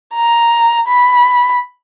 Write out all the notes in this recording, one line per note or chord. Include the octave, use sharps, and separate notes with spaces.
A#5
B5